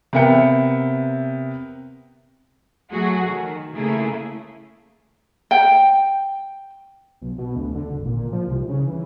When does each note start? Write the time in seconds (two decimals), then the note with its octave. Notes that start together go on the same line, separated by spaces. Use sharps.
0.13 C3 B3 A#4 E5 G5 C#7
2.92 F#3 A3 F#4 G#4
3.26 D#3
3.74 C#3 A3 A#3 E4 G#4
5.51 G5
7.22 B1
7.38 B2
7.56 D2
7.75 D3
7.92 G#1
8.05 A#2
8.32 F3
8.48 C2
8.69 C#3
8.87 E3